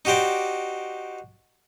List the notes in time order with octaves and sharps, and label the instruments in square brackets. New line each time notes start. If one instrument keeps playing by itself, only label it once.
[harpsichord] D#4 F#4 G4 C5 D5